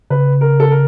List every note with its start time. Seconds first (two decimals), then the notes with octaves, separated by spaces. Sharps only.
0.10 C#3 B4
0.41 A#4
0.60 A4
0.71 A#4